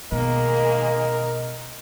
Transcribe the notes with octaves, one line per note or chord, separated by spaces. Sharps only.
B2 D#3 G#3 A#3 A#4 D#5